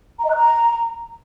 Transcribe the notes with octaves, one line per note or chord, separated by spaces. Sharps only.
A#5
D#5
F#6
A#5